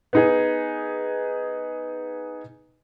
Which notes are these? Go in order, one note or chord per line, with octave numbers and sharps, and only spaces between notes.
B3 D#4 G#4